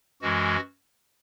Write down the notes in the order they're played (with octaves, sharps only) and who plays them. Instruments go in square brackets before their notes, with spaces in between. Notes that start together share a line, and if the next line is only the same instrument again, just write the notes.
[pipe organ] F#2 E3 G#3 F#4